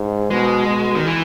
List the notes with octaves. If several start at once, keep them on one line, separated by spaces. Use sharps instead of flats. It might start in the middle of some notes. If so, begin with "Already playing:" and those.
Already playing: G#2
B2 G#3
B2
D#3
E3